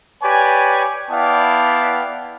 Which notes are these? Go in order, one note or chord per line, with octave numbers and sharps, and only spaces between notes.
G4 B4 C#5 D5 G#5
B3 E4 D5 F5 G5 A5